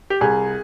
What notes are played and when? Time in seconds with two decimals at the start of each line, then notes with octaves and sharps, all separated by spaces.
0.10 G4
0.21 C2 G#4